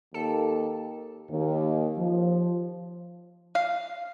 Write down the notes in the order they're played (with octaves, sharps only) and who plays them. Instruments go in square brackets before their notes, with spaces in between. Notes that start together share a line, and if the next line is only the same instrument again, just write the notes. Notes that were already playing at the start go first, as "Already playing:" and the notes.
[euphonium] D#2 [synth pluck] A4
[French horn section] D#2
F3
[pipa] F5